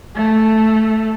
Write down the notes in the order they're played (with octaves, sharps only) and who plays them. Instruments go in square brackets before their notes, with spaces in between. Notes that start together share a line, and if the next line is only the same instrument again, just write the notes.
[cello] A3